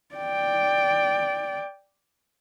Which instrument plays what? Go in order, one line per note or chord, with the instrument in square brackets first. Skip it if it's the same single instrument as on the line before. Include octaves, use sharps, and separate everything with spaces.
[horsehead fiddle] D5 G5